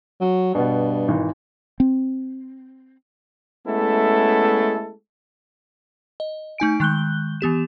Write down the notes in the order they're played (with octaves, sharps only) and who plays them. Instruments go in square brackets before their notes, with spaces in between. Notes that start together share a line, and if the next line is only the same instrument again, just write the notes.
[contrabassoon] F#3
[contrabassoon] G2 [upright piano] B2 B3
[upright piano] G#1 D#3 E3
[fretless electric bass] C4
[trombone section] G#3 A3 B3 C#4 E4 A4
[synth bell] D#5
A3 D#4 G#5 D7
D#3 G#3 F#6 G6 G7
E3 B3 G4 E7